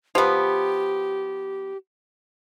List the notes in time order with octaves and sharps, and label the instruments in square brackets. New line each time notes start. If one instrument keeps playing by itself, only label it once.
[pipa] F3 B3 [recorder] G4